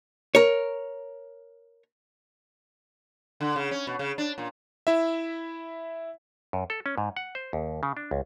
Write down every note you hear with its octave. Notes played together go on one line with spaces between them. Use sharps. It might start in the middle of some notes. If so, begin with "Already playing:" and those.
A#4 C#5
D3
C#3
C#4
B2
C#3
D4
A#2
E4 E5
F#2
A4
C#4
G#2
F#5
C5
D#2
C#3
D4
C#2